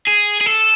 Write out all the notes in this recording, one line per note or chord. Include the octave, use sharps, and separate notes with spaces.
G#4
G#4
A4